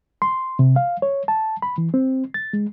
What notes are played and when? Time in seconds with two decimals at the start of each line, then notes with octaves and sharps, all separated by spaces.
0.22 C6
0.59 C3
0.76 F5
1.02 C#5
1.28 A5
1.62 B5
1.78 E3
1.94 C4
2.34 A6
2.53 G#3